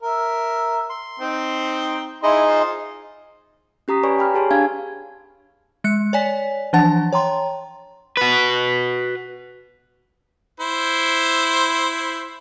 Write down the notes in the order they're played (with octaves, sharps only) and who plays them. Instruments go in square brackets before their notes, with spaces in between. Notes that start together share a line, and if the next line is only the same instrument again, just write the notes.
[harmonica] A#4 E5
[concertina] C6
[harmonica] C4 D#4 G5
[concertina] D#4 G#4 D#5 [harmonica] E4 C6
[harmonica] F4 C5
[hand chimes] C#4 G4 A#5 D#6 B6
B4 C#5 D5 G#5 B5 C#6
G5 G#5 A#5 B5 D6 F6
G4 G#4 C#5 A5 C6
D4 G4 F5 G#5 F6 G#6
[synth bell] G#3 F#6 C#7
C#5 D5 G#5 B6
E3 F3 D4 F#5 A5 A6
C#5 G5 A#5 C6
[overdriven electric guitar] F#4 B4
[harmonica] E4 C5